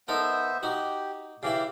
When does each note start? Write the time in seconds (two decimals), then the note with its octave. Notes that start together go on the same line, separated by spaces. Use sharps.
0.08 B3 D#4 A4 A#4 C5 E5
0.63 D#4 F#4 G4
1.43 C#3 E3 E4 G4 F5